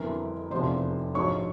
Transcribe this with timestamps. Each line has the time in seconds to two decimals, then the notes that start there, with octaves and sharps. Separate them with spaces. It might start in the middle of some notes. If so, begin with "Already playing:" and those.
Already playing: G1 F2 E3 A#4 A#5
0.51 F1 E2 C3 F3 C5 C6
1.14 A#1 G#2 F3 C#5 C#6